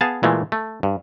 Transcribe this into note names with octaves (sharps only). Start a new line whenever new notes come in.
B3 G#4 F5 A5
A#2 E3 G#3 A3
A3
G2